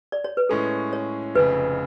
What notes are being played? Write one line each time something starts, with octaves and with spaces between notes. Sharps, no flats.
D5
C#5
B4
A2 G#3 C#4 G#4 A4
C#5
F1 F2 C#3 B4